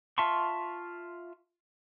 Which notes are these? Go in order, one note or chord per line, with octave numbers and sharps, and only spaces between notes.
F4 E5 A5 C6 C#6